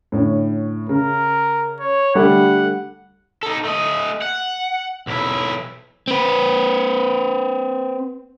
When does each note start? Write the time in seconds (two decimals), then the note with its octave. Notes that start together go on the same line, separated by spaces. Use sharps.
0.12 A2 D3 C#4
0.89 C#3 A#4
1.80 C#5
2.15 D3 G3 A3 G4 F#5
3.43 D#4 A4
3.65 A3 D#5
4.22 F#5
5.07 B1 E4
6.08 C4 B4